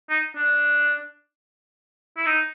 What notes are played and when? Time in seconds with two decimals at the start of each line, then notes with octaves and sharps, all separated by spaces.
0.10 D#4
0.36 D4
2.17 E4
2.26 D#4